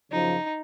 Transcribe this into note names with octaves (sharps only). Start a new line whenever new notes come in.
F#2 C#3 F3 D#4